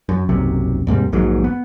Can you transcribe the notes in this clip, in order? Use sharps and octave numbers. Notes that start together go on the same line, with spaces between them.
F#2
D#1 B1 F#2 C3
D#2 G#2 C3 G3
A#1 D#2 G#2 F#3
B3